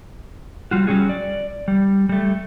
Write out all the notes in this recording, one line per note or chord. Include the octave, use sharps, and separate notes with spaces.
G3 F4 F#4
F#3 G3 C#4 D#4 G#4
D5
G3
G3 A3